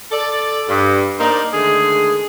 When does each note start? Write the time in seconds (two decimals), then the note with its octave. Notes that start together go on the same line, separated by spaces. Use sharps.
0.12 A4 D5
0.68 G2
1.19 A#3 D4 D#4 A#4 C5 D5
1.53 D3 D#3 G#3 A3 G#4